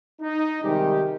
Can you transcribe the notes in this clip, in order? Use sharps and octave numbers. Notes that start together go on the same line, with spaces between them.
D#4
C3 D#3 G3 G#3 G4